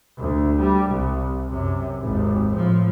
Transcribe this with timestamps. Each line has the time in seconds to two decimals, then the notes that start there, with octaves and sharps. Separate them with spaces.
0.18 D2
0.61 G3
0.91 C2
1.47 F#2 C3
2.01 G#1 D#2
2.53 A2 F3